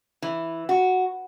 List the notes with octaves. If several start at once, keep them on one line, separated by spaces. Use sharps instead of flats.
E3
F#4